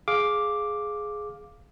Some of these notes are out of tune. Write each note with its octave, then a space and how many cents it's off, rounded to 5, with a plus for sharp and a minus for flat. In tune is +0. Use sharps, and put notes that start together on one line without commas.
G#4 +10 F5 +5 D6 +0